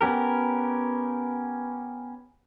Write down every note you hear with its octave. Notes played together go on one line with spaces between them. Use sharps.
B3 C#4 G4 A#4